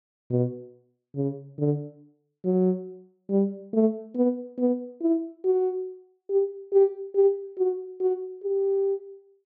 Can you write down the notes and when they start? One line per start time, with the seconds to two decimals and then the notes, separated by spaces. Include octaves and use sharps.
0.30 B2
1.16 C#3
1.59 D3
2.45 F#3
3.30 G3
3.73 A3
4.15 B3
4.58 B3
5.01 E4
5.44 F#4
6.29 G4
6.72 G4
7.15 G4
7.57 F#4
8.00 F#4
8.43 G4